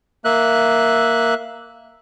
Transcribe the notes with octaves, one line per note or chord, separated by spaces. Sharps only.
A#3 E5 F#6